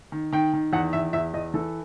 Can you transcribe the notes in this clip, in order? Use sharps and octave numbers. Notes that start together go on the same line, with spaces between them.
D#3
D#3 G5
D#3
E2 F#5
E2 E5
E2 E5
E2 D#5
E3 A4